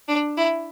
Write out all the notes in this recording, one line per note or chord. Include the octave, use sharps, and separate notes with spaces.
D4
E4